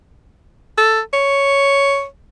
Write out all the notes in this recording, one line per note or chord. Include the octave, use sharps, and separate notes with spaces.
A4
C#5